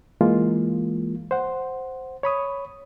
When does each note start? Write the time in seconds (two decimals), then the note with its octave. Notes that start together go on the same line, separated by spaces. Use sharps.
0.21 E3 G#3 A#3 F4
1.31 C5 F#5
2.23 C#5 B5 D#6